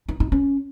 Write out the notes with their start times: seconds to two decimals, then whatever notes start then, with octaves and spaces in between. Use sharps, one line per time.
0.09 D#4
0.20 D#4
0.32 C#4